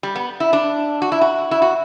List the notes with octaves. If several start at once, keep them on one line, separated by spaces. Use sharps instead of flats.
G3
B3
E4
D4
F#4
E4
F#4
E4
F#4